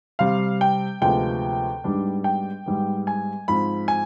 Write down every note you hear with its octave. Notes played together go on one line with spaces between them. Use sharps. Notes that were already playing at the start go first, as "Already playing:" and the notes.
C3 G3 C4 F5
G5
D2 C3 F3 G#3 B3 G5
G#2 G3 B3 D4
G5
G#2 G3 B3
G#5
G#2 F3 C4 B5
G#5